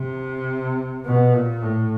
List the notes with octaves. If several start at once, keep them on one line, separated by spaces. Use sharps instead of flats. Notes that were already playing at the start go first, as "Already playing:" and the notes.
Already playing: C3
B2
A#2
A2